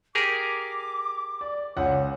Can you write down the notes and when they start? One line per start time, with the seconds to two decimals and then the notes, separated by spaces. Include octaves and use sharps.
0.15 G4 G#4 A#4 D6
1.41 D5
1.77 C#2 C#5 F#5